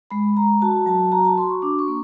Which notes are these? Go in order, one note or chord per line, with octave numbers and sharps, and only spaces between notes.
G#3 B5
G#3 A#5
F#4 A5
F#3 A5
F#4 A#5
A5
F#4 C6
C#6
D4 D6
C#6
A#3